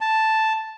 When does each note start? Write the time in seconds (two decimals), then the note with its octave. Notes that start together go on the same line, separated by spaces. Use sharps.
0.01 A5